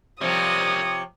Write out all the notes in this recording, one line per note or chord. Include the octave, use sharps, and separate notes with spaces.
C3 F3 G3 A#3 C#5 D#6